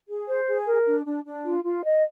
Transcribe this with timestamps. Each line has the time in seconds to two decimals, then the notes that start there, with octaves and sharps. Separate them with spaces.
0.08 G#4
0.27 C5
0.47 G#4
0.66 A#4
0.86 D4
1.06 D4
1.25 D4
1.44 F4
1.64 F4
1.84 D#5